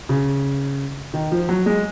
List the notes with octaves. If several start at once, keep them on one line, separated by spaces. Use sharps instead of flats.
C#3
D#3
F3
F#3
G#3